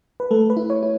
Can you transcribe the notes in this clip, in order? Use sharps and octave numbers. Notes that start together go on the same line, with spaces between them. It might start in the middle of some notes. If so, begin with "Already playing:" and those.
B4
A3 A4
B4
E4
C#5
E4